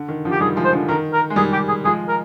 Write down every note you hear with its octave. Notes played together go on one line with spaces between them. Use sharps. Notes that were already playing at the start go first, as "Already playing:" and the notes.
Already playing: D3
D#3
D3 F3
G4
D#3 G3 G#4
F3 G#3
C5
D3 F3
D#3 A#4
A#4
G#3
D#3 G3 G#4
G4
G#4
F3 G#3 G#4
A#4